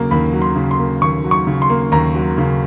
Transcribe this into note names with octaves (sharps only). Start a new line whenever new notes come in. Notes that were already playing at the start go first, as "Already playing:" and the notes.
Already playing: D#2 C#3 F#3 A#3
D#2 B5
F#3
C6
C#3
C6
A#3
D#2 C#6
F#3
C#6
C#3
C6
A#3
D#2 A#5
F#3
C#3